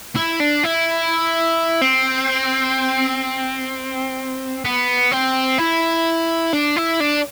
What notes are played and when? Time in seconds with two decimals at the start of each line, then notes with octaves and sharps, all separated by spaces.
0.16 E4
0.40 D4
0.64 E4
1.81 C4
4.64 B3
5.12 C4
5.58 E4
6.53 D4
6.76 E4
7.00 D4